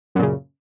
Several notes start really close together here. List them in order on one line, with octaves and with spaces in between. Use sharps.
F#2 A#2 C#3